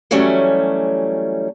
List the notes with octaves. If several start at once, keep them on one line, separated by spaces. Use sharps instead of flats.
E3 F#3 G3 A3 C#4